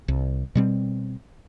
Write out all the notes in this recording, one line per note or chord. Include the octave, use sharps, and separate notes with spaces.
C2
B2 G3 C4